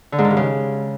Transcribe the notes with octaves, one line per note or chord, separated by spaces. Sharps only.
D3
G#2
D#3
G2
C#3